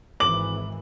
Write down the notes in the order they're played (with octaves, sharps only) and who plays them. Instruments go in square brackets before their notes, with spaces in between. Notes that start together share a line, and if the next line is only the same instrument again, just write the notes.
[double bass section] G#1 E3 [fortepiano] D6 [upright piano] F#7